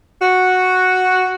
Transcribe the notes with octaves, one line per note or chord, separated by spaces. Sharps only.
F#4